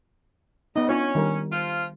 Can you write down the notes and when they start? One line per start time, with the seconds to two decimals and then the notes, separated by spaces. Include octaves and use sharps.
0.76 C#3 G3 B3 D#4 D#5
0.89 C#4 D4 F4 C#5
1.15 D#3 G3 A#4
1.51 F3 F4